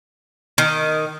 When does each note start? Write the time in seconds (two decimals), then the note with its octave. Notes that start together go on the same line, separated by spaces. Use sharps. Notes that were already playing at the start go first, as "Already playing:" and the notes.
0.58 D#3